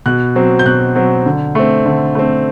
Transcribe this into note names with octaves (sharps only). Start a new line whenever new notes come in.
B2 F#6
F#3 C4
G6
B2 F#6
F#3 C4
D3
A3 C4
D3
A3 C4